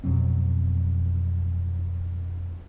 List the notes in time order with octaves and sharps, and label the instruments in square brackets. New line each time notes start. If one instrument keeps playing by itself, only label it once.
[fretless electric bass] F2 B2 F#3 C4